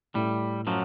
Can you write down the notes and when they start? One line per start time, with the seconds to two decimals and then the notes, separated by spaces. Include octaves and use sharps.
0.15 A2 G3
0.67 F#2 F3 F#3